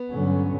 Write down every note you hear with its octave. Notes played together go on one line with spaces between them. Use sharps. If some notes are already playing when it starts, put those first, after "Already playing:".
Already playing: B3
G2 D3 F#3 C#4